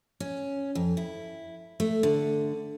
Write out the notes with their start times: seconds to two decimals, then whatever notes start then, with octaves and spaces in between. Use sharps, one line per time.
0.20 C#4
0.75 F2
0.97 E4
1.80 A3
2.03 D3